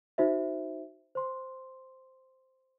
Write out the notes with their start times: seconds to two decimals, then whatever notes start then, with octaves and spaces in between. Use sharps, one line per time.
0.18 D#4 F#4 C5 E5
1.15 C5 C6